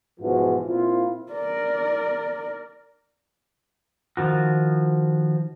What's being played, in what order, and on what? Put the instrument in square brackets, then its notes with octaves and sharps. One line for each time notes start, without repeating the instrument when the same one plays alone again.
[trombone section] B1 G#2 E3 F3 G#3 F#4
A#2 C4 E4 F4
[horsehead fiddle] A#4 D5
[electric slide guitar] D#3 F3 F#4